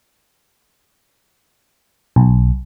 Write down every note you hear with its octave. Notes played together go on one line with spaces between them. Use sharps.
B1